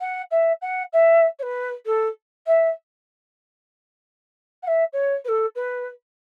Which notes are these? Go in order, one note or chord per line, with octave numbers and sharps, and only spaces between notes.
F#5
E5
F#5
E5
C#5
B4
A4
E5
F#5
E5
C#5
B4
A4
B4